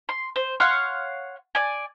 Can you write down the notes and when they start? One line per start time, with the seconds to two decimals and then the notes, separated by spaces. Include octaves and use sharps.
0.09 C6
0.36 C5
0.60 C#5 F5 F#5 C6
1.55 D5 G#5